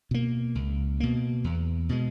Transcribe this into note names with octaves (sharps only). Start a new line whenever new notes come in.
B2 A#3
C#2
B2 A#3
E2
B2 G#3